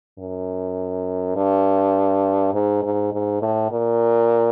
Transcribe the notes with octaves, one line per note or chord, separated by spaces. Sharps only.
F#2
G2
G#2
G#2
G#2
A2
A#2